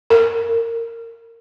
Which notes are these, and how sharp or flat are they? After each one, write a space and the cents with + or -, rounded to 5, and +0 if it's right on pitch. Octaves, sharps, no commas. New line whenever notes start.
A#4 -20